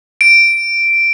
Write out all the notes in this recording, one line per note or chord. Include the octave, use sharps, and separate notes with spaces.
D7